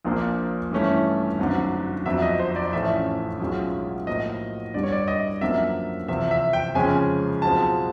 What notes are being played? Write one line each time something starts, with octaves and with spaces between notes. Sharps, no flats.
A#1 A#2 F3 A#3 D4
G2 E3 A3 C#4 E4
G#1 F#2 D3
F2 D3 F#3 B3 E5
D#5
C5
D5
A1 A2 F3 A3 C#4 E5
B1 B2 G#3 C#4 F4
A2 F3 A#3 D#5
G2 D3 G3 D5
C#5
D5
D#5
F#2 D3 F3 A#3 E5
E2 C3 F3 E5
E5
G5
F2 C#3 F3 G#3 C#4 G#5
B1 B2 G#3 C4 F4 A5